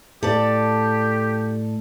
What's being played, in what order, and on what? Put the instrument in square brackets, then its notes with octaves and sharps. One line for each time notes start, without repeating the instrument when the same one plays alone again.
[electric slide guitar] A2 [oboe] G4 [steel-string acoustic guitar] A4 D5